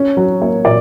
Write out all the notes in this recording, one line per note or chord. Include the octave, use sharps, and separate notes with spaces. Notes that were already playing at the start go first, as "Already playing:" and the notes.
Already playing: C#4
F#3
A#3 C#5
A#2 D5